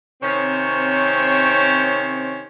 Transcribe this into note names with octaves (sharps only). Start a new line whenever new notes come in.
C3 D#3 C4 C#4 C5 C#5